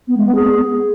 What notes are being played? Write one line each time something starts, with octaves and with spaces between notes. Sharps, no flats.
B3
G#3
B3
G#4